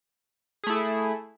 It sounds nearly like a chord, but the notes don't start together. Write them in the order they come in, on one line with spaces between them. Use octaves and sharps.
G#4 A3 E4